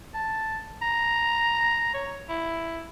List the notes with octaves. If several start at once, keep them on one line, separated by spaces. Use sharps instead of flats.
A5
A#5
C#5
E4